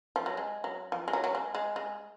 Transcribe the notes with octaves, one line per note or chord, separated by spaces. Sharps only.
F3
F#3
G#3
F#3
F3
G#3
F#3
F#3
G#3
G#3
G#3